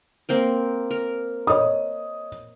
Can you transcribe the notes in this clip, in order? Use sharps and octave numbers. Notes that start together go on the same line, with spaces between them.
A#3 C4 A#4
A#4
C#5 D#5 D#6